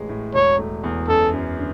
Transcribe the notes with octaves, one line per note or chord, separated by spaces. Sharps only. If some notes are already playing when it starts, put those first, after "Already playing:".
Already playing: A1 G#3
A2
E1 C#5
A3
E2
F#2 A4
F#2
D3